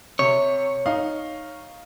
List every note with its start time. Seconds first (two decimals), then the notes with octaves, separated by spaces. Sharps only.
0.19 C3 C#5
0.86 D#4 F5